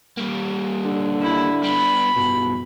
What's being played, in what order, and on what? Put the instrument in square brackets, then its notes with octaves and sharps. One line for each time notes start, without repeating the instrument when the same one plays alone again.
[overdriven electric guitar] G3 A#3
[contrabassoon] D3
[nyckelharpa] E4
[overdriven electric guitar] G3 B3 [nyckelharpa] B5
[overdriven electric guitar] B1 G2 [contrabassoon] B2